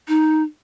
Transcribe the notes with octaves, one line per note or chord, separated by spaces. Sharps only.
D#4